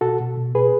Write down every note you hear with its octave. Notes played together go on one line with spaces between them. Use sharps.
B2 F#4 A4
B2
B2
B2 G#4 B4